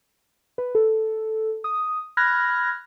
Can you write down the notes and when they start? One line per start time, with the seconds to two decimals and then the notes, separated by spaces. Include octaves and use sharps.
0.58 B4
0.75 A4
1.64 D#6
2.17 B5 F6 F#6 G#6 A#6